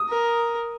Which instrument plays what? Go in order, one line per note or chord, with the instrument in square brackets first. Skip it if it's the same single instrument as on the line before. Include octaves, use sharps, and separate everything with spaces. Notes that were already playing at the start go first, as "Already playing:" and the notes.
Already playing: [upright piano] D#6
[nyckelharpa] A#4